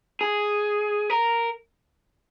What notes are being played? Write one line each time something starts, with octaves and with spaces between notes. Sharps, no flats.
G#4
A#4